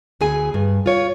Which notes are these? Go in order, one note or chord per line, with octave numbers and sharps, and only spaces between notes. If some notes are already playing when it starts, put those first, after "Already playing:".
D2 E4 G#4 G#5
G2
F4 C#5